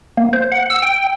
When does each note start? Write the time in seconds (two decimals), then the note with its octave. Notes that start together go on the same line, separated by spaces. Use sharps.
0.17 A#3
0.33 C5
0.52 F#5
0.70 E6
0.82 G5